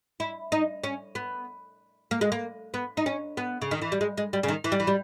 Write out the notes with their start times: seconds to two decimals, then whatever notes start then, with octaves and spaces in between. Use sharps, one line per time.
0.20 E4
0.52 D#4
0.84 C#4
1.15 B3
2.11 A#3
2.21 G#3
2.32 A#3
2.74 B3
2.97 D#4
3.06 C#4
3.37 B3
3.62 C#3
3.71 D#3
3.82 E3
3.92 G3
4.01 G#3
4.17 G#3
4.33 G3
4.43 C#3
4.48 D#3
4.64 E3
4.72 G3
4.80 E3
4.87 G3